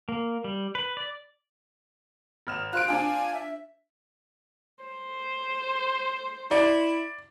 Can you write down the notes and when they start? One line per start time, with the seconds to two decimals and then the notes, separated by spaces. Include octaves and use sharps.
0.09 A#3
0.44 G3
0.75 B4
0.97 D5
2.47 G#1 F6 E7
2.73 F4 C5 F#6 D7
2.88 C4 D4 F4 G#5
3.34 E5
4.84 C5
6.51 E4 D5